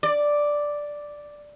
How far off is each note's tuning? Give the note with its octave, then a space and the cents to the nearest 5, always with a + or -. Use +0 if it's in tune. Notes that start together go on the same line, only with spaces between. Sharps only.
D5 +0